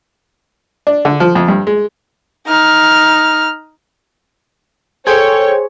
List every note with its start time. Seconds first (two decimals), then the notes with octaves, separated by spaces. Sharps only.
0.87 D4
1.05 D3
1.20 F3
1.35 F2
1.48 G2
1.67 G#3
2.47 D#4 F6
5.07 G#4 A4 C5 C#5 G5 G#6